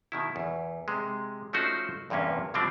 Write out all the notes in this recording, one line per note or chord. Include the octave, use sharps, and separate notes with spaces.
B2 D#3 E4
E2
C3 G#3
F3 A3 C#4 D#4 F#4 C5
E2 G2 C3 A#3 C#4
B2 D3 F3 G3 C4 D4